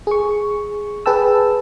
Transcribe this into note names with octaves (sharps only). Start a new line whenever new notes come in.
G#4 C#6
G#4 B4 G5 A5 E6